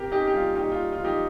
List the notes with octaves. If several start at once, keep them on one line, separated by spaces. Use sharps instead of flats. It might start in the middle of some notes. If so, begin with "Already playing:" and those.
Already playing: C3 G4 A#4
C#4 D#4 G4
G4
G3 F4
A#2 D#4 G4
F4
A#2
F4
F3
D#4 G4